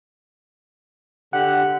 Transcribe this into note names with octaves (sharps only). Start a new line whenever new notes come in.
D3 G4 F#5 F#6